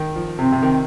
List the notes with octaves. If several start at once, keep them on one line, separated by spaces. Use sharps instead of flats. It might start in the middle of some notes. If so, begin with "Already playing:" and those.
Already playing: D#3
F3
C3 C4
C3
D#3